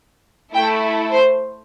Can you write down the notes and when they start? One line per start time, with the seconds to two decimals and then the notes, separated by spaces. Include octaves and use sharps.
0.54 A3 E4 A4 G5
1.11 C5